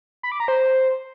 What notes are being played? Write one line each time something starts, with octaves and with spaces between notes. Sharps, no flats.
B5
D6
A#5
C5